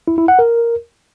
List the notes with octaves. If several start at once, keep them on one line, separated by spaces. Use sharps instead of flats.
E4
E4
F#5
A#4